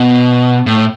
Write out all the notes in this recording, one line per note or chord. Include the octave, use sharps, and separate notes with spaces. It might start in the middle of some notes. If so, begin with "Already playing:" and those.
Already playing: B2
A2